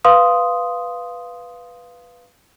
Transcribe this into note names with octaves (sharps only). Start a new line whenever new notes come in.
B4 F5 C6 D#6